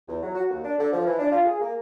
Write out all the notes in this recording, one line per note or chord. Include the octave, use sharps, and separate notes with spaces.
E2
F#3
F#4
D#2
D4
D3
F3
E3
D4
F4
G#4
A#3